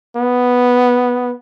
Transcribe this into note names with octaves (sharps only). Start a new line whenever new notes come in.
B3